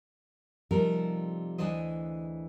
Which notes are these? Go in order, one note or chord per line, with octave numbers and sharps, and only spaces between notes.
C3 F3 G3 A3 D#4 A#4
D2 E3 D4 G#4 C5 D#5